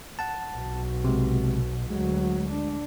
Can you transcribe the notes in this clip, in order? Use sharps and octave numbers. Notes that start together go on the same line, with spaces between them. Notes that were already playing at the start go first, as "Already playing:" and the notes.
F#5 A5
B1 B2
C3 G#3
D2 F#3 G#3
D4